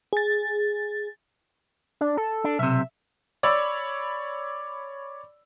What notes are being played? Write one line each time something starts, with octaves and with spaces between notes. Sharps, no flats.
G#4 A6
D4
A4
D4
B1 C3 E5
C#5 D5 B5 E6